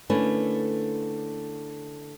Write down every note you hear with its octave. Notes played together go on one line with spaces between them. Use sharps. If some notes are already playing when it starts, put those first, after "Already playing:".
D3 A3 A#3 C#4 E4 B4